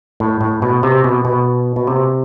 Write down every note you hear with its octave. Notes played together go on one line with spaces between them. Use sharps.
A2
A2
B2
C3
B2
B2
B2
C3